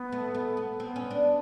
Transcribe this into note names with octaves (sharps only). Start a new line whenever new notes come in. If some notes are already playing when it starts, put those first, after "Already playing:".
Already playing: B3
A3
A3
B3
B3 C4
C#4
D4